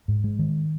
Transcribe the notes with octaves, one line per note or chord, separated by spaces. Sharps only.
G#2
G#3
D#3